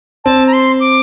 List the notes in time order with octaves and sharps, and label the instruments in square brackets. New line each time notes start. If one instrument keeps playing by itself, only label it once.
[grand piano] C4 [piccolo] A5
[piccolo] A#5
C6
D6